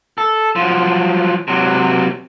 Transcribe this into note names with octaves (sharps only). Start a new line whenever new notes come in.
A4
F3 F#3
C3 F#3